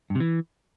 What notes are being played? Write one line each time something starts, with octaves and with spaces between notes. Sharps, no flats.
G2
C3
E3